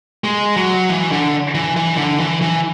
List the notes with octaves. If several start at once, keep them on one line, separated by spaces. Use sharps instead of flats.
G#3
F#3
E3
D3
E3
E3
D3
E3
E3